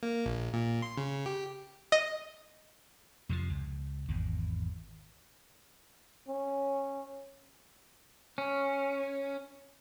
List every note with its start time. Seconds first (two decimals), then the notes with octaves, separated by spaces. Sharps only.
0.03 A#3
0.26 A#1
0.53 A#2
0.82 C6
0.97 C#3
1.26 G4
1.92 D#5
3.29 F2 C3 E3 F3
3.50 C#2
4.08 G#1 E2
6.28 C#4
8.38 C#4